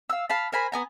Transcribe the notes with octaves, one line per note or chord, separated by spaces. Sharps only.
F5 E6
F5 A5 B5
A#4 C5 G#5 B5
B3 G#5 A#5